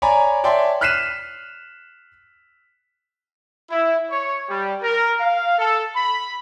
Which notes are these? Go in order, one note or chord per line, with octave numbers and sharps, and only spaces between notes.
C#5 D5 G#5 A#5 B5
C#5 D5 E5 G5 A5 C6
F6 F#6 B6 C7 D#7 E7
E4
C#5
G3
A#4
F5
A4
B5